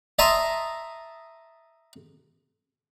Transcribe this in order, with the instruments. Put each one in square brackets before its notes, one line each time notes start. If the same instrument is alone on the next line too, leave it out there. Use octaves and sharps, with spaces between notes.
[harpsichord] D#5 E5 A5 A#5 C6 D#6